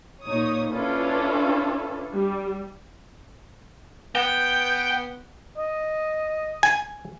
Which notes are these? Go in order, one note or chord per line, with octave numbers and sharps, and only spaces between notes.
A#2 D#4 C#5 D#6
C#4 D4 E4 F4 A4 B4
G3
B3 G5
D#5
G#5